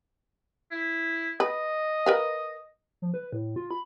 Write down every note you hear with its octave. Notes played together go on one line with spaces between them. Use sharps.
E4
B4 D#5
A#4 B4 F5
F3
B4
A2
F4
B5